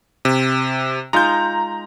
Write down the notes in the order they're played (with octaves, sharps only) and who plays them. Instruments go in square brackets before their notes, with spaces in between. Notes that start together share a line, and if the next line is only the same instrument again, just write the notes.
[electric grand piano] C3
[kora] G#3 D#4 F4 [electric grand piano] A#5 G6